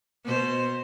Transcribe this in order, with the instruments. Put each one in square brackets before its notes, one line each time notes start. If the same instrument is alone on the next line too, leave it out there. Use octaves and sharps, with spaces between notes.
[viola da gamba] B2 C5